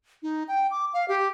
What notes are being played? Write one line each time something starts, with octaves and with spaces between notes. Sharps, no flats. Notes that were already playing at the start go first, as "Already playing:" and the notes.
D#4
G5
D6
F5
G4